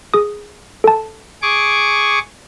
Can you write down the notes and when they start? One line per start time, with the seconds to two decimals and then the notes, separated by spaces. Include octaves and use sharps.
0.14 G#4 D#6
0.84 A4 A5
1.42 G#4 C#6 D6